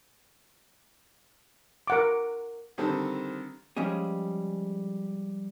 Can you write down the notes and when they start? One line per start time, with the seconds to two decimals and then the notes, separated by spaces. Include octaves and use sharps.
1.87 A#4 F#5 D6
2.78 D3 D#3 G3 C4 A4
3.77 F3 G3 G#3 C#4 G#4